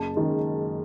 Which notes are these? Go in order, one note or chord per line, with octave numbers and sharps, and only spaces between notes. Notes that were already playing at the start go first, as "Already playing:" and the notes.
Already playing: F#1 A5
F#2 D#3 G#3